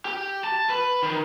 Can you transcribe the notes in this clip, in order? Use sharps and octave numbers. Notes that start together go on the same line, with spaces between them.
G4
A5
B4
D#3